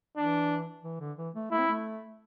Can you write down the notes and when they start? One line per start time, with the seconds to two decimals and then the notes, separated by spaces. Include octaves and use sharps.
0.17 E3 D4
0.84 E3
1.00 D3
1.18 E3
1.35 A3
1.51 A3 E4
1.59 C4
1.67 A3